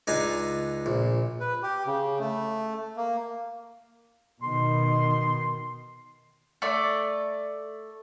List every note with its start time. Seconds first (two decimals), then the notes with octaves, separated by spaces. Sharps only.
0.07 C#2 D4 D#4 G#5 A#5
0.86 A#1
1.40 B4
1.63 G4
1.86 C#3
2.19 A3
2.97 A#3
4.43 B2 D#3 C6
6.62 A3 D5